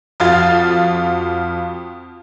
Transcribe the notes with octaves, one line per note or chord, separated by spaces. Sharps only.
F2 F4 F#4 F5 A6